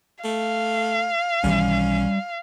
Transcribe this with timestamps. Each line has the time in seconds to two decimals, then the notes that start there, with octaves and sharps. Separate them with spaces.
0.25 A3 F5
1.44 B1 D#3 E3 G3 C#4